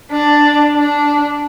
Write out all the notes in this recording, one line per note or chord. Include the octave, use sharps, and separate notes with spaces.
D4
D4